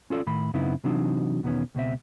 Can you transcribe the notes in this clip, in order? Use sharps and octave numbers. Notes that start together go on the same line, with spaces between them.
C#4 F4 A4 D5
A2 D#3 B5
F#2 C#3 B3 C4 D#4 E4
C3 E3 F#3 C4 D4 D#4
E2 B2 D#3 B3 C#4
C#2 B2 C4 E5